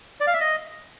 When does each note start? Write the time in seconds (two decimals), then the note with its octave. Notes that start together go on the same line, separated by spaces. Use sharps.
0.20 D5
0.27 F5
0.34 E5
0.40 D#5